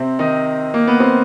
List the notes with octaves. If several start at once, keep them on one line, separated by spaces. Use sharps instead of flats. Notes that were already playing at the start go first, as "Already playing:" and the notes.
Already playing: C3 C4
D#3 D#4
A#3
B3
C4